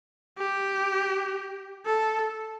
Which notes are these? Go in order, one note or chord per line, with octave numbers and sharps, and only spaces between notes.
G4
A4